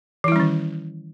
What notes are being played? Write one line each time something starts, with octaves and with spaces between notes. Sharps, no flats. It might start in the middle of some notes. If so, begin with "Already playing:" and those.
D#3 E3 G3 C#4 E4